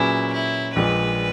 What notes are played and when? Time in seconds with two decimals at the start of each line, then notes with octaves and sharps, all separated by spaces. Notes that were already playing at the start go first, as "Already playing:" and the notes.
Already playing: A#2 F#3 C#4 E4 G#4 B4
0.32 E4
0.75 A#1 A#2 G#3 B4